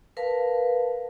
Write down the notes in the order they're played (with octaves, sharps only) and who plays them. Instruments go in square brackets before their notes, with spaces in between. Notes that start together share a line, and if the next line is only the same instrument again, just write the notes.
[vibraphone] A#4 B4 F5 A5